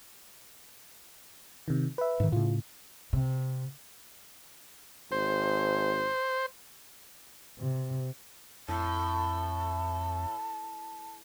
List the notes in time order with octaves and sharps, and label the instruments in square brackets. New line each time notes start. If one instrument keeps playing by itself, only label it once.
[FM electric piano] C3 D#3
B4 E5
[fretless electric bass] G#2 D#3
[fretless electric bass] A2 C#3 [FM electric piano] F4
[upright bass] C3
[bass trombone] G#1 [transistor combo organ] C5
[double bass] C3
[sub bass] F2 [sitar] A2 [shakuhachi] A5